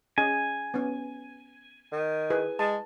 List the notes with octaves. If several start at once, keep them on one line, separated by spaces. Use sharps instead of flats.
C#4 G#4 D#5 G#5
B3 C#4
D#3
E4 G#4 B4
G#3 A5